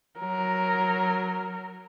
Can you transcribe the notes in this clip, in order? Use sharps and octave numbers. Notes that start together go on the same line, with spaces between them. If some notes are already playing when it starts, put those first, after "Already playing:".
F#3 A#4